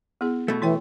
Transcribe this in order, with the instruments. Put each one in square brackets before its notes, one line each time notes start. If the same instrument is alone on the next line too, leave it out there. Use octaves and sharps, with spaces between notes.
[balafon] B3 E4 G#4
[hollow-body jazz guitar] B2 A3
[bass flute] E3 [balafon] E4 C#5 G5